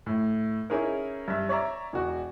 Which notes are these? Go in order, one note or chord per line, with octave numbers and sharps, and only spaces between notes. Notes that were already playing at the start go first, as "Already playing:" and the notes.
A2
C#4 D#4 E4 G#4 A#4
G2 E5
C#5 D5 E5 A#5
E1 F#4